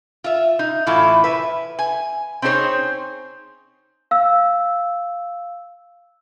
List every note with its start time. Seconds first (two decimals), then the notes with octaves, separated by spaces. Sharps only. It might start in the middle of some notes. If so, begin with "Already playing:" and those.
0.24 F4 E5
0.59 D#4
0.87 A2 E3 E4 F4
1.24 B4 E5
1.79 G#5
2.42 C4 C#4 D#4 G#4 C5 C#5
4.11 F5 E6